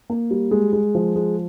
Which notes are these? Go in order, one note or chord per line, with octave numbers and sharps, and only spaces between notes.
A#3
G3
G#3
G#3
F3
G#3